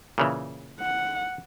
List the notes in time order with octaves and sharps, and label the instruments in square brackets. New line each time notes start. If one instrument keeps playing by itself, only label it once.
[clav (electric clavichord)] A#2 C#3 E3
[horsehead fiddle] F#5